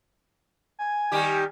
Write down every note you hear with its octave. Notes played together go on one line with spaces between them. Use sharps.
G#5
D#3 G3 G4